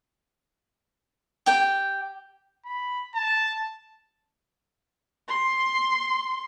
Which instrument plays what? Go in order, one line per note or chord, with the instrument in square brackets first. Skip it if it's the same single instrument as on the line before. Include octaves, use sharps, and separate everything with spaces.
[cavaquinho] G4 G5
[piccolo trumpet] B5
A5
[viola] C6